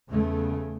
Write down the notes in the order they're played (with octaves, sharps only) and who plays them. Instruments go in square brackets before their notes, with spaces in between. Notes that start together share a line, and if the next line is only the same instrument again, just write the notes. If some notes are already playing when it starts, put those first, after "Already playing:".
[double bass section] E2 C#3 A3